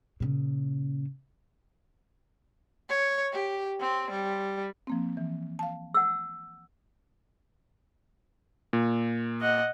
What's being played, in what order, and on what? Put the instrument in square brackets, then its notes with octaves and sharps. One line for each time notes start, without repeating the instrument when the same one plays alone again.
[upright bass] A#2 C#3
[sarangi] C#5
G4
C4
G3
[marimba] F3 A#3 C4
E3
F5 A5
[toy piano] F#5 E6
[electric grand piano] A#2
[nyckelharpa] D#5 F#5